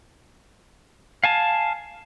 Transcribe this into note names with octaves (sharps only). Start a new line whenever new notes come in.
F5 G#5 A5